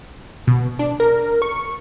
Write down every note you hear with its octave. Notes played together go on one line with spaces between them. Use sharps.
B2
D4
A#4
C#6